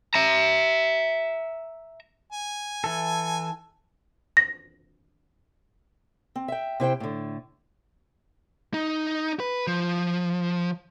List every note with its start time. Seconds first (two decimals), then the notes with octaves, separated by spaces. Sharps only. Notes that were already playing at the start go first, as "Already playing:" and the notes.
0.14 E5 A#5
2.33 G#5
2.84 E3 A4
4.37 A#6
6.36 C4
6.48 E5 G5
6.80 C3 E4 C5 G5
7.00 A2 D3
8.74 D#4
9.40 B4
9.67 F3